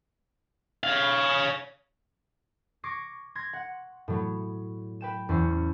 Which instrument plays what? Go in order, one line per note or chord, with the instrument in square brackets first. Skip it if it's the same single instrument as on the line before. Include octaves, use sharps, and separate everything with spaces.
[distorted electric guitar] C#5 F5
[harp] C#6 D6 G#6 A#6 C7
C6 G#6 A#6
F#5
A2 F#3 B3
B4 G5 E7
E2 C#4 E4 C5